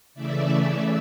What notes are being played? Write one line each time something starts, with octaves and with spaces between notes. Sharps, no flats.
C#3 E3 A3 D5 E5